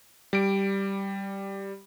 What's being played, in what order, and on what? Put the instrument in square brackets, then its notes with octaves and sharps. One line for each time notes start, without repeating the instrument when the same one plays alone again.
[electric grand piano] G3 D7